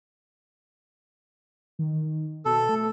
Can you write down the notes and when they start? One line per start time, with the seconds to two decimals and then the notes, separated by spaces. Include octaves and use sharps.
1.79 D#3
2.45 B2 A4
2.69 A3